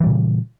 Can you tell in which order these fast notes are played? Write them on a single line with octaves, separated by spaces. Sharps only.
E3 G3 A#2 C#3